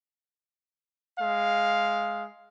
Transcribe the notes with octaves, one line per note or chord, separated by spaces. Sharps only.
G#3 F5